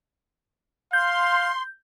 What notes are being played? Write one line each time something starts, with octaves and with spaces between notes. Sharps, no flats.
F5 C6 G6